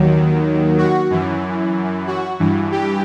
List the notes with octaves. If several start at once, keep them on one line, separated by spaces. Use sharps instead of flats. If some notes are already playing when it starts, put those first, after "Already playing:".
Already playing: D#2 D#3 F#3
F#4
F#2 E3
F#4
G2 E3
G4